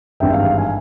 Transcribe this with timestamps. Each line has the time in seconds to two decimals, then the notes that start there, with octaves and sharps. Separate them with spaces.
0.20 G#1 G2 E3 E5 G5
0.33 F5
0.45 F5
0.58 F5 G#5